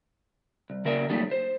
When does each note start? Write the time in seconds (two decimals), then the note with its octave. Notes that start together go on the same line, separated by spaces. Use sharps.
0.70 C2
0.85 C#3 A#3 A#4 D5 E5
1.10 F#3 G3 A3 A#3 D#4
1.31 C5